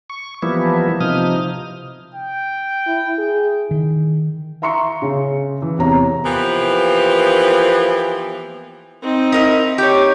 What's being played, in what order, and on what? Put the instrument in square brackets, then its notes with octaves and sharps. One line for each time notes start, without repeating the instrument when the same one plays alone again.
[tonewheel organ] C#6
E3 F3 G3 A#3 B3 E4
C3 F3 D#4 D#6 F6
[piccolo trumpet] G5
[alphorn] E4
G#4
[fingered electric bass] D#3
[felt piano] E5 A#5 C6 C#6 C#7
C#3
E3
E2 C3 C#5 A#5
[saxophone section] E3 F3 A#3 B3 G4
[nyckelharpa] C4 D#4
[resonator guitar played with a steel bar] E4 A#4 D#5
[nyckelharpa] D#4 [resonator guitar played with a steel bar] G4 C#5